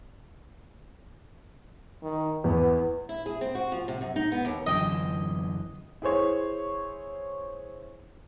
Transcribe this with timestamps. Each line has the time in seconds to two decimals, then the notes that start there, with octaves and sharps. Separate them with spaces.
2.03 D#3
2.44 E2 B3
3.09 E4
3.26 G#4
3.41 C4
3.55 F#4
3.72 F3
3.88 C3
4.01 F#2
4.16 D#4
4.32 B3
4.45 D#2
4.67 F#2 D3 E3 D#5 G5
6.02 E4 G#4 C5 C#5